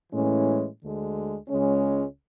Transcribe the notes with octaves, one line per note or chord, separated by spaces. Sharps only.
A2 E3 G#3 C#4
D2 D3 G#3
C#2 C#3 G#3 C#4